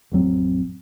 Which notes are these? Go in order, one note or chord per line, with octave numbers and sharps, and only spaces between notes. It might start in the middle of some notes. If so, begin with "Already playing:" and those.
A1 F2 F#3 C4